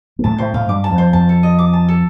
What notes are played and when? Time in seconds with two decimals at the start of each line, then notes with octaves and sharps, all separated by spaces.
0.19 A#3
0.24 A2 A3 A5
0.38 A2 A3 C5
0.54 A2 A3 F5
0.69 G2 G3 D6
0.84 A5
0.91 F2 F3
0.98 C5
1.13 F2 F3 A5
1.29 A4
1.43 D#5
1.59 D6
1.73 A5
1.89 A4